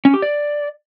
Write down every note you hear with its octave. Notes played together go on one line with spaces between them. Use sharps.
C#4
G4
D5